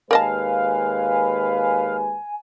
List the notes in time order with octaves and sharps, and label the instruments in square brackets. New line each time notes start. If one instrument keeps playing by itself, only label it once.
[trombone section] D#2 G#3 B4 [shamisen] A#4 D#5 A5 [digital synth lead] F5 [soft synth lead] G#5